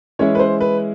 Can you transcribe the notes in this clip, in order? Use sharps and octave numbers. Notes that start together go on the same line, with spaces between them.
E3 G#3 C#4 E4 C#5
B4
C5
B4